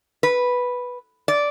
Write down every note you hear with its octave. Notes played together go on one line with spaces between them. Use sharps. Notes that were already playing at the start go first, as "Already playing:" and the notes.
B4
D5